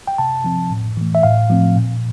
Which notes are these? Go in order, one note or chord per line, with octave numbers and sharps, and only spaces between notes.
G5
C3 A5
F3 C4
A2
E3 A3
E5
A2 F5
F3 A3 C4
A#2